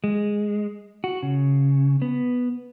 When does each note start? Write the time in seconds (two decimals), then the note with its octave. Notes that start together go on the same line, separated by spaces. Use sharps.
0.04 G#3
1.04 F#4
1.23 C#3
2.02 B3